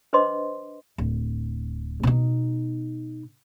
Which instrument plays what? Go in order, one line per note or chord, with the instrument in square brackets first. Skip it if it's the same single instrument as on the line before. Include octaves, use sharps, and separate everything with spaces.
[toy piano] D4 B4 C5 D#5 C6 D6
[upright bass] D1
B2 D#4